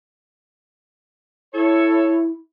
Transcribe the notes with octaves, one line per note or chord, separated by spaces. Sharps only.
E4 A4 C#5